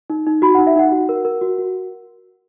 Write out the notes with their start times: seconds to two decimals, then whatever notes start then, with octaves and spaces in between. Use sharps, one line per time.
0.10 D#4
0.26 D#4
0.42 F#4 B5
0.55 D#4 F#5
0.67 E5
0.76 D#4 F#5
0.92 F#4
1.09 A#4
1.25 A#4
1.41 F#4
1.58 F#4